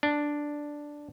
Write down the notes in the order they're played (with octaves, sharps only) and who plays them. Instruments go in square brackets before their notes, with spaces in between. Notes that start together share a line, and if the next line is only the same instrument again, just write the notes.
[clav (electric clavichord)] D4